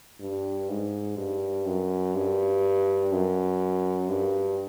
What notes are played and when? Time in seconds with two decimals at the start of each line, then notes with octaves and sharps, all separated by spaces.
0.20 G2
0.69 G#2
1.18 G2
1.66 F#2
2.15 G2
3.12 F#2
4.10 G2